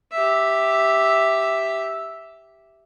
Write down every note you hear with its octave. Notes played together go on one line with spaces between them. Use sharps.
G4 E5